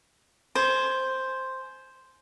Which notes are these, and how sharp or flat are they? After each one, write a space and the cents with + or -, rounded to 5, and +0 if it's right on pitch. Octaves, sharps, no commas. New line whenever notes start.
C5 +0 G#5 +30